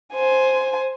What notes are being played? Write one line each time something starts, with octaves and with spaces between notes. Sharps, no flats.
C5 G#5